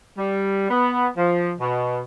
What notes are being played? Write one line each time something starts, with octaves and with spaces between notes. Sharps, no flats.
G3
B3
F3
B2